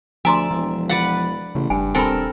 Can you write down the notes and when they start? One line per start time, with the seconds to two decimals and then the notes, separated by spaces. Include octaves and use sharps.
0.25 D2 F3 D5 E5 G#5 A#5 C6
0.51 E1 F3
0.89 B4 D5 F5 F#5
1.55 A1 C#3
1.70 F#1 G2 G#5
1.95 E1 C4 A4 A#4 G#5 B5